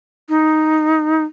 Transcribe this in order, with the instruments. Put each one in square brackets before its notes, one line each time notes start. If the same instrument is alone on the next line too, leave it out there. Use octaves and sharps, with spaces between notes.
[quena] D#4